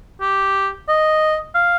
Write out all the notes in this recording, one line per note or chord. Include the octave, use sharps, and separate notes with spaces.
G4
D#5
F5